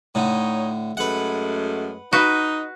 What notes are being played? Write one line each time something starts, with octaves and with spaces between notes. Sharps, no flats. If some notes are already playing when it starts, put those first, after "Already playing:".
A2 D3 D#4 C#5
F#2 G#3 A3 B4 F#5
D#4 F#4 B4